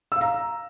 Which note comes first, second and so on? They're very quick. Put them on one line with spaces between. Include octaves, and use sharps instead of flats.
E6 F5 A#5